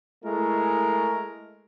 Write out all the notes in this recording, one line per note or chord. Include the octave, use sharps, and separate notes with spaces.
G#3 A3 E4 A#4